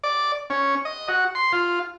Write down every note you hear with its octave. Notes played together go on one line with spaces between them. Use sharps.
D5
C#4
D#5
F#4
C6
F4